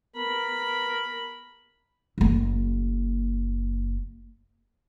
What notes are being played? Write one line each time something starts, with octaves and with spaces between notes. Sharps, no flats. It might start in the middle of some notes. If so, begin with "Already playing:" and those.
B3 A#4 B5
F#1 A#3